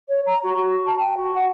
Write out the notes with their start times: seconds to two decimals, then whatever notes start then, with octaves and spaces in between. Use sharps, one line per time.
0.08 C#5
0.26 A#5
0.43 F#4
0.56 F#4
0.86 A5
0.99 G5
1.17 F#4
1.34 F#5